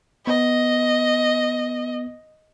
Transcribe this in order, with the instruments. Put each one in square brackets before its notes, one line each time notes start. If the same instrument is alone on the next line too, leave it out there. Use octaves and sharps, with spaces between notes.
[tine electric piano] B3 [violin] D#5